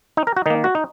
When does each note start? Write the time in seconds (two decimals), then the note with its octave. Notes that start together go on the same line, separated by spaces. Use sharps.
0.17 D#4
0.27 A#4
0.37 F#4
0.46 D#3 A#3 D#4
0.64 F#4
0.75 D#4